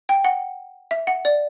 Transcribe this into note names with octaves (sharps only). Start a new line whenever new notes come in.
G5
F#5
E5
F#5
D5